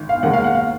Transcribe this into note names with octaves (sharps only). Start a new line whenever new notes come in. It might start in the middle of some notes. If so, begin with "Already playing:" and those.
Already playing: G#1
F5
D#2 D#3 G#3 F#5
F5
F#5
F5